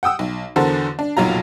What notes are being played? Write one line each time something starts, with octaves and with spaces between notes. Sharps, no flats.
F#5 G5 D#6 E6
B1
E2 D3 F#4 A4 A#4 C5
D4
F1 B1 A#2 F#3 F4 A#5